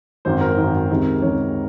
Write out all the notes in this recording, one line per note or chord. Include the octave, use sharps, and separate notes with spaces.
G#1 F#2 D#3 C5
A#4
G#1 F#2 D#3
C#2 C3 D#3
C#2 C3 D#3 C#5